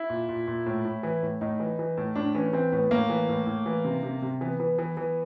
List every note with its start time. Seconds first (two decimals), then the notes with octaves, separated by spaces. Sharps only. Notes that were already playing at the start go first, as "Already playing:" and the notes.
Already playing: E4
0.10 A#2
0.29 A#2
0.48 A#2
0.66 A2
0.85 A2
1.03 E3
1.23 A2
1.41 A2 D#4
1.60 E3
1.79 E3
1.97 A2
2.15 A2 D4
2.35 E3 C#4
2.53 E3 C4
2.72 A2 B3
2.91 A2 A#3
3.09 E3
3.29 A2
3.47 A2
3.66 E3
3.85 C3
4.03 C3
4.22 C3
4.41 E3 B3
4.60 E3
4.78 E3
4.97 E3